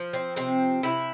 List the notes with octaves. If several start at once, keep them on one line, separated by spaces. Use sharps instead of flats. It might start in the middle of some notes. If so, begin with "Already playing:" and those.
Already playing: F3
C4
C3 C4
C3 E4